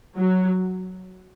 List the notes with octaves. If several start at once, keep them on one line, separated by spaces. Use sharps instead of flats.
F#3